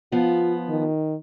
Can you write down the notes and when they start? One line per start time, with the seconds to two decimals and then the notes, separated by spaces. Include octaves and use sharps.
0.12 F3 B3 F4
0.69 D#3